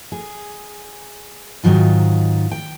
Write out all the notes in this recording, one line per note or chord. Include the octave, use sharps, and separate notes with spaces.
G#4
G#2 D#3 F#3 F4
G5